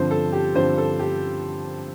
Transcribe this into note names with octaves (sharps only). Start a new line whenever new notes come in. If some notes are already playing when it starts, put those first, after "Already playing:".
Already playing: G2 D3 F3 C4 C5
A4
G4
G2 D3 F3 C4 C5
A4
G4